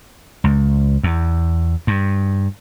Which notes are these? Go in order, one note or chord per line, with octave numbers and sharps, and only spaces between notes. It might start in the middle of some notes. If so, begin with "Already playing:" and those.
C#2
E2
G2